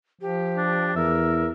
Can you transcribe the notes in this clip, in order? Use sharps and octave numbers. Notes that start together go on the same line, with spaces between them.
F3 G4
D4
E2 A#4 E5